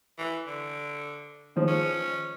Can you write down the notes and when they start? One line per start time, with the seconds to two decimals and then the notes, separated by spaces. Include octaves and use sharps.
0.19 E3
0.47 D3
1.56 D#3 F3 G#3
1.68 C#4